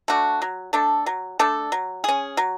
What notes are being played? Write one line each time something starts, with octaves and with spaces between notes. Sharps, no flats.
A3 D4 F#4
F#3
A3 D4 A4
F#3
A3 D4 A4
F#3
C#4 G#4
F#3